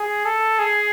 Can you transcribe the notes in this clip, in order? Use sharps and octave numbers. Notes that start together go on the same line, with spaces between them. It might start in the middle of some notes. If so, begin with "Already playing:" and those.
Already playing: G#4
A4
G#4